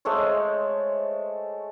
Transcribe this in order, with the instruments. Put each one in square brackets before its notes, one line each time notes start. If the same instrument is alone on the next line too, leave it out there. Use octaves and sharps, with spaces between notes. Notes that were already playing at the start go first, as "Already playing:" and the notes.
[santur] G#3 A3 C5 C#5